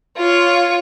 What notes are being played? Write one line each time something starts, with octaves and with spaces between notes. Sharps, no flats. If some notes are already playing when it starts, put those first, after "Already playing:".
F4 C#5